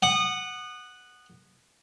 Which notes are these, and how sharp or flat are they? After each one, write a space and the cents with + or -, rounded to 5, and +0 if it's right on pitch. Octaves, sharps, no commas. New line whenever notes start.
F#5 +0 D#6 -25